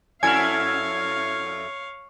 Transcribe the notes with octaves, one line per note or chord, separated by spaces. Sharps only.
F2 A3 E4 C#5 F5 G#5 F6 G#6